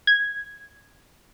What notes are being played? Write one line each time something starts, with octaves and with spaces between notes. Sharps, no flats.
G#6